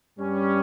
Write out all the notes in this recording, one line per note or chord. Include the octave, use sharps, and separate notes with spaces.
G2 G3 C#4